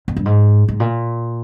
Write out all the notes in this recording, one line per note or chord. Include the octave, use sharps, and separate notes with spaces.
F2
G2
G#2
G#2
A#2